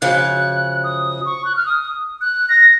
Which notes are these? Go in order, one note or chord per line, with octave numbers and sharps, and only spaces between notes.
F#2 C#3 F3 F#6
D#6
C#6
F#6
F6
D#6
F#6
A#6